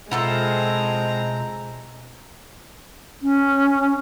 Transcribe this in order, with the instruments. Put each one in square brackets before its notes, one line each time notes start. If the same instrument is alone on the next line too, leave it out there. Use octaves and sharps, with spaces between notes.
[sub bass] B2 [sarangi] G#3 [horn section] C4 A#5 [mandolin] E4 F4 A4
[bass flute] C#4